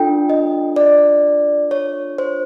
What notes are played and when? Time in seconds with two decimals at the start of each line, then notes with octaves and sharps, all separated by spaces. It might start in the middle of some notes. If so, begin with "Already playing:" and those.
Already playing: D4 F4 A4 G5
0.29 D#5
0.76 D5
1.71 C#5
2.18 C5